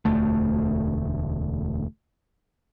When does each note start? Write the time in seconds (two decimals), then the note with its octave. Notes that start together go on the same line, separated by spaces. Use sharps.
0.05 E1 D2 A3